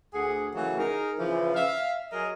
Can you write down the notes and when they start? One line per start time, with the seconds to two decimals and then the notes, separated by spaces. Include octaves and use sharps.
0.14 D2 G#4 F#5
0.54 C#3 E3 F#3 A3 A#3 F#4
0.78 D#4 G#4 A#4
1.19 C#3 E3 F3
1.55 E5 F5
2.11 F#3 G#4 A#4 D#5